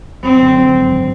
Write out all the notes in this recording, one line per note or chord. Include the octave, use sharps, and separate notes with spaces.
F#2 C4
D3
F#3
G#1